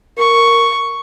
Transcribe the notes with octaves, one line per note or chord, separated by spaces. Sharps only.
A#4 C#6